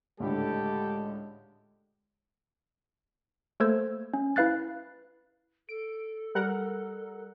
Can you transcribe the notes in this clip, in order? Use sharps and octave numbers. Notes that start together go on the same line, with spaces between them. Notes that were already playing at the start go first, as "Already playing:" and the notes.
C#2 A2 D3 G#3 G4 A4
A3 A#3 A4 C5 E6 G#6
C#4
E4 B4 F5 F#6 A6
A4 D7
G3 A#4 F#5